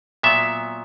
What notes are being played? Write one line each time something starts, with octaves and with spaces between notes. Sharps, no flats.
A#2 F#3 B3 E5